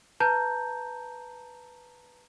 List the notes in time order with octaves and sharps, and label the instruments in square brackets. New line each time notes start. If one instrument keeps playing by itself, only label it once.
[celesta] B4 A5 A#5 G6